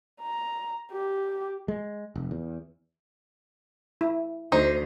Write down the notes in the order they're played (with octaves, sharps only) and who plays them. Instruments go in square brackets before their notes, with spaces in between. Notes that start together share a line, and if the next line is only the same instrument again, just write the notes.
[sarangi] A#5
G4
[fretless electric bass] G#3
F1
E2
[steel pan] E4
[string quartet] D2 [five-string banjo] D#4 [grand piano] C5